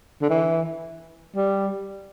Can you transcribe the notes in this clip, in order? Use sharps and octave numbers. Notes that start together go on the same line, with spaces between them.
D3
E3
G3